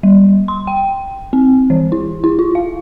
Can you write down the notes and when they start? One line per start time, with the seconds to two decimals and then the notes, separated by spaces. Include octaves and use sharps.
0.03 G3
0.48 C6
0.67 G5
1.33 C4
1.70 E3
1.92 E4
2.24 E4
2.39 F4
2.55 F5